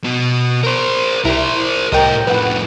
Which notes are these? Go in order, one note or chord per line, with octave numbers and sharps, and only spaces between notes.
B2
A#4 C5
C2 E4 A#4 C5
C2 A2 A#4 D#5 G5
F2 A2 B4 F#5